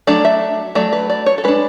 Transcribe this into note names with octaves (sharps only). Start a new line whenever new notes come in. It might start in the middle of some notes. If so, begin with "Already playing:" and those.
F#3 A3 D4 D5
E5
F#3 A3 D5
B4
D5
C#5
A4
G#3 D4 B4